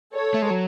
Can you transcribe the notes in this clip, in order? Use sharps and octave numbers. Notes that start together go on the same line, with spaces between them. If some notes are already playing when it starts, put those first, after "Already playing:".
A4 C#5
A3
G#3
F#3